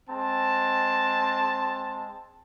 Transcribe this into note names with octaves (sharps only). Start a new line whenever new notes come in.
G#3 C4 A5